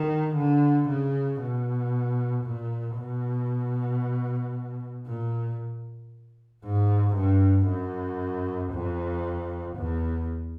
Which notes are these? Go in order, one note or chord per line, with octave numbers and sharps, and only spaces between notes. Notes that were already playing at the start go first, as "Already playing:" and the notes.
Already playing: D#3
D3
C#3
B2
A#2
B2
A#2
G#2
G2
F#2
F2
E2